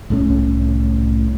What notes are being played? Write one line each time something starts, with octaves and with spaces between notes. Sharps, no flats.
C2 A2 A3 C#4